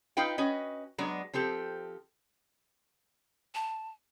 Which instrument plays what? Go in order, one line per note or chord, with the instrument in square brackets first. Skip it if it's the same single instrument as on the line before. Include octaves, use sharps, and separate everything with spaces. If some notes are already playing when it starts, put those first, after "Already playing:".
[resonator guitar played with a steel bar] D#4 F4 B4 F5 G5
C#4 F#4 B4 D#5
F#3 G#3 B3 D4
F3 C4 G4 A4
[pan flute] A5